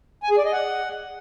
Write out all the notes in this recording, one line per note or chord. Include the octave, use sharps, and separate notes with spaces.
G#5
G#4
D5
D#5
F#5